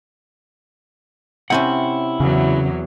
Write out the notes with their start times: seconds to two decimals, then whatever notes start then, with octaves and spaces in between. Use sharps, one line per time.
1.50 C3 C4 C#4 E4 F#5
2.20 E2 C#3 F#3